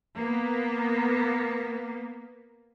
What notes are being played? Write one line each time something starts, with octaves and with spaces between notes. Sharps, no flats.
A#3 B3